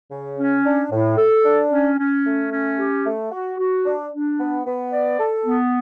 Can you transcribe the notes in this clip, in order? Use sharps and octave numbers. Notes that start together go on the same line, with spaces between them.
C#3
C#4
D4
A2
A4
D4
C#4
C#4
A3
C#4
G4
A3
F#4
F#4
D4
D4
B3
B3
D5
A4
B3